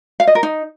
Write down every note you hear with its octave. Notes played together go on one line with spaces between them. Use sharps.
F5
D#5
A#4
D#4